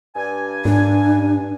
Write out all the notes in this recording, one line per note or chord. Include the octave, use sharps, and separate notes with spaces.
G2 G#5
G#2 D4